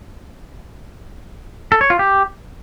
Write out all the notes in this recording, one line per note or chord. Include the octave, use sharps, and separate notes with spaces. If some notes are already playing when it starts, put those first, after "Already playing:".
A4
C#5
F4
G4